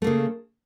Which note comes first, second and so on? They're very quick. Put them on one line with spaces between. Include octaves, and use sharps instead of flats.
A3 A#3 C#3